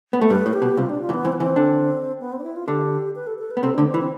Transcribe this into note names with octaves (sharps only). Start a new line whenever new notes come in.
B3
A3
G2 G3 B4
A2
G4
B2
C2 C3 F4
D4
F4
E2 E3
B3
E2 E3 C4
B3
E2 E3 C4
D3 D4
B3
C4
D4
E4
F4
D3 D4 G4
B4
A4
A4
B4
B3
C3 C4 A4
D2 D3 D4
C4
E3
C4